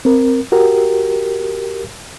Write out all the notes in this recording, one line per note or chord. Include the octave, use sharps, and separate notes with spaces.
C4 A#4
F#4 G4 A#4